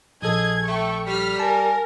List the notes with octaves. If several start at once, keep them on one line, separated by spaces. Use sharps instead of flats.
A#1 G#4 A4 D#5 G#6
A3 G5 C#6
G3 F6 B6
A#4 G#5 A5